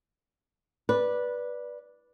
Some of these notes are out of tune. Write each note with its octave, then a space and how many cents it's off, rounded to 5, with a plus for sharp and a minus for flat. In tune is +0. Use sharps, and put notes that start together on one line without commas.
B4 -15 D5 +0